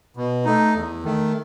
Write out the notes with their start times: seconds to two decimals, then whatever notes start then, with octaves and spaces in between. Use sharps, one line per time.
0.17 B2
0.45 A3 D#4
0.75 E2
1.03 D#3 A3